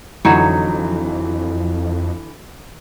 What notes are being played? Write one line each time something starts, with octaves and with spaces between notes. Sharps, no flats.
F2 D3 E3 F#3 D#4 C#5